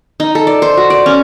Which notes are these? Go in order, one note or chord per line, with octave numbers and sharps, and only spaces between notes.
D#4
A4
D5
C5
F#4
D5
C#4